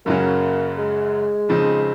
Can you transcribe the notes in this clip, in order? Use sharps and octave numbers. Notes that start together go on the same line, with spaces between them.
F#2 C#3 F#3 A#3 C#4
G#3
F2 C#3 F3 C4 D#4